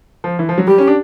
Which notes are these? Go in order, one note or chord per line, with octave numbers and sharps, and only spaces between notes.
F3
E3
F3
F#3
G3 G4
C#4
D4